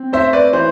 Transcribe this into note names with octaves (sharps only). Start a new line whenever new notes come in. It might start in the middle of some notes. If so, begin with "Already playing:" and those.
Already playing: C4
A3 C5 E5
B4 D5
E3 C5